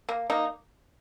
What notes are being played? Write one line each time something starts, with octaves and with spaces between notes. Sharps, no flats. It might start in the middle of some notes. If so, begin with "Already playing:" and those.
A#3
A#3 D#4